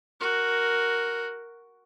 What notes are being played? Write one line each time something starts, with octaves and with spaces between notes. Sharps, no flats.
F#4 A#4